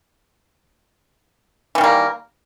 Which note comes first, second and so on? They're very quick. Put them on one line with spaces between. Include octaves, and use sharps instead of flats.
E3 D#3 G3 A#3